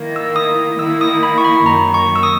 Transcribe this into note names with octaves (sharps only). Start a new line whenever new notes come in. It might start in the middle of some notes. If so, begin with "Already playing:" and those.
Already playing: D#3 A#3 E4
E6
D#6
D#3 A#3 E4 E6
D#6
B5
C#6
B5
F#2 D#3 A#3 A#5
C#6
E6
D#6